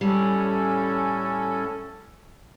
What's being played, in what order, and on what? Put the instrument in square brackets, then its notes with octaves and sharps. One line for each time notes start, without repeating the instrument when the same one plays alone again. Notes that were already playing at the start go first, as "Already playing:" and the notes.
[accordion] A2 C#4 A4 [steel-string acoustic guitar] G3